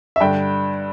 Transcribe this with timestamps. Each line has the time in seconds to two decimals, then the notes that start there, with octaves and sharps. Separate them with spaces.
0.16 E5
0.20 G2 D3 G5